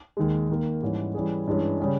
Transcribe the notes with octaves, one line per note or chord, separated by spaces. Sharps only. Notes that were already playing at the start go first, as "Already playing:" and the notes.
D#2 D#3 G#3
D#2 D#3 A#3
G#2 E3 G3 C#4
E3 G3 C#4 G#4
G2 E3 G#3 C#4
C#3 G3 C#4 G#4